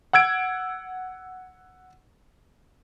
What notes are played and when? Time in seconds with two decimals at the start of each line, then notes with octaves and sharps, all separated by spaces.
0.13 F#5 E6 G#6 D7